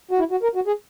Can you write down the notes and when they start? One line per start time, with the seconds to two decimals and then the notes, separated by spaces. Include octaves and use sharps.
0.11 F#4
0.19 E4
0.31 F#4
0.43 A#4
0.55 F#4
0.67 G#4